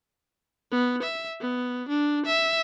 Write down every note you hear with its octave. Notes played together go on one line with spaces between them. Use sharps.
B3
E5
B3
D4
E5